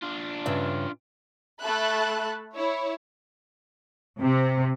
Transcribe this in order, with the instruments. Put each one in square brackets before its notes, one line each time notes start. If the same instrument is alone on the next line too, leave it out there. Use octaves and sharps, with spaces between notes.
[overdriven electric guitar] D4 F4
[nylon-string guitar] G2 C#3 E5
[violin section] A3 A4 E5 A5 B5 F#6
E4 C#5
[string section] C3